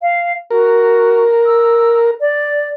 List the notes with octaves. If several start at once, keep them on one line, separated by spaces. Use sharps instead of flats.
F5
F#4 A#4
E6
D5